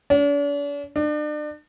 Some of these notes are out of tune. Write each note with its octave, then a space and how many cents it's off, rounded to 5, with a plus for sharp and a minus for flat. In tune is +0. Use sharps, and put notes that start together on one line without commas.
D4 -45
D4 +35